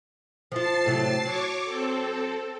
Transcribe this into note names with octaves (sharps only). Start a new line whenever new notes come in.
F3 F4 A5 A6 C7
A2 C3 F#3
F#3 C#5 C#6 D6
C4 A4